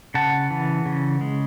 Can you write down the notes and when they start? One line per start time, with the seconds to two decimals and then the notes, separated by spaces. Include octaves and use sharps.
0.14 C#3 F#5 A5
0.51 E3
0.86 C#3
1.21 G#3